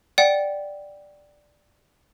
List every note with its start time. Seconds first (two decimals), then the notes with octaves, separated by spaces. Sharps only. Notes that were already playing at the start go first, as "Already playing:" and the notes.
0.18 D5 F#5 G5